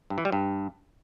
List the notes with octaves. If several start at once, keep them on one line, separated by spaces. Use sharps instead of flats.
G2
E3
G3
G2